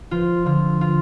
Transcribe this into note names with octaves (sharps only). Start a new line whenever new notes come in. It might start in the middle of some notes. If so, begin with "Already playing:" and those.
F3 F4
D3 F4
F4